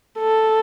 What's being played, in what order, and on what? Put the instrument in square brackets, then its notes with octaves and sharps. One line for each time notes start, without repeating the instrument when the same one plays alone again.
[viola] A4